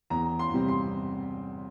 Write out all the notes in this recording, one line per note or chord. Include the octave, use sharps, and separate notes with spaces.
E2 A#5
C6
C3 G3 C4
C6